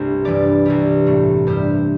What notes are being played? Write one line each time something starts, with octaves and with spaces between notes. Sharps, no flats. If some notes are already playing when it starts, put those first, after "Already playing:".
Already playing: C2 G2 C3 A3 C5
G2 E3 G3 D5
C2 C3 G3
A2 A3
G2 G3 C5